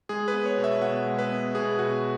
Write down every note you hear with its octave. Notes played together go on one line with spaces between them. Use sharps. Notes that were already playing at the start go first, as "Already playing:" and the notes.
G#3 G#4
B4
B3
C#5
B2
E5
B2 F#5
G#3
B4
B3
B2 G#4
B2 F#4